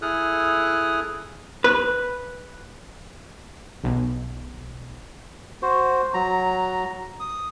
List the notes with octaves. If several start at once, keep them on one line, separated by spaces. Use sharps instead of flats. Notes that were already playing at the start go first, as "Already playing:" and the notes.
E4 G#4 A4 D#6 F6 F#6
B4
B1
F#4 C5
F#3 A#5
D#6